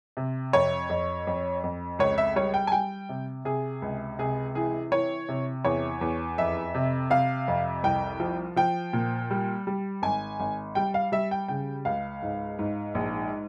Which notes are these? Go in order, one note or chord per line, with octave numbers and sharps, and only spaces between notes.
C3
F2 C#5
F2
F2
F2
C#2 C#5
E5
G3 C#5
G5
G#5
G3 G5
C3
C3 G#4
C#2
C3 G#4
E3 G#4
E3 C#5
C3
E2 C#5
E2
F2 E5
C3
C3 F5
F2
C2 G5
F3
F3 G5
A#2
G3
G3
G#1 G#5
G#1
G3 G5
F5
G3 E5
G5
C#3 G5
C#2 F5
G#2
G#2
A#1